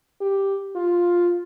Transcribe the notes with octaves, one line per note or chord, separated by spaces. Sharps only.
G4
F4